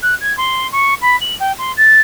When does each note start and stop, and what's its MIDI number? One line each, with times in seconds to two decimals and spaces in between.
0.02 0.15 90
0.20 0.35 92
0.37 0.67 84
0.72 0.94 85
1.01 1.16 83
1.21 1.35 102
1.40 1.52 79
1.58 1.72 84
1.77 2.00 93